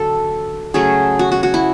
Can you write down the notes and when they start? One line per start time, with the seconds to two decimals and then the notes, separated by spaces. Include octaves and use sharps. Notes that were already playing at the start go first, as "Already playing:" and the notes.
Already playing: D3 F#3 A4
0.74 C#3 F#3 A3 C#4 G#4
1.19 F#4
1.32 F#4
1.43 F#4
1.54 E4